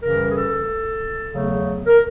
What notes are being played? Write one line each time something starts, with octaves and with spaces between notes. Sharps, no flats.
F#2 C#3 E3 G3 A#4
G#4
A4
E2 C#3 F#3 A3
A#4